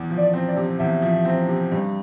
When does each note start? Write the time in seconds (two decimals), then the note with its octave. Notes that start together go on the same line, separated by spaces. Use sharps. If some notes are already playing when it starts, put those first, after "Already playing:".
Already playing: E2
0.10 F3
0.17 D5
0.33 C4
0.48 D5
0.57 C3
0.79 E2 E5
1.02 F3
1.25 C4
1.48 C3
1.71 G2